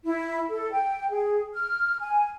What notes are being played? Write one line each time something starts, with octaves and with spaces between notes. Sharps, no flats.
E4
A4
G5
G#4
F6
G#5